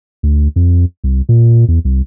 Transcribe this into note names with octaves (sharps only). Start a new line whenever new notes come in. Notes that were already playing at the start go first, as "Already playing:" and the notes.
D2
F2
C2
A#2
E2
C2